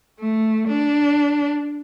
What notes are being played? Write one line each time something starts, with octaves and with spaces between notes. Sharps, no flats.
A3
D4